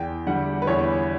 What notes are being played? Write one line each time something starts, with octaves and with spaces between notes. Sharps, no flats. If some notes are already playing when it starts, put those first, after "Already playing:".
Already playing: E2 G5
D3 G3 F#5
B4
E2 C#5